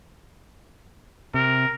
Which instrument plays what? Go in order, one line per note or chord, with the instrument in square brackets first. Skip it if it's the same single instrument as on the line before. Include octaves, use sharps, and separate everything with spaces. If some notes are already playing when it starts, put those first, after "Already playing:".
[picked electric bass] C3 [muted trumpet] A#4